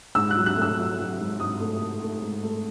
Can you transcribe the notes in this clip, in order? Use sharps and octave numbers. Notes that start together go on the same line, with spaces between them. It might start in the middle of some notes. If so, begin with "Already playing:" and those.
G#2 E6
F#6
F#3
F#6
A3
E6
F#3
F#3
G#2
G#2 D#6
A3
A3
A3
G#2
A3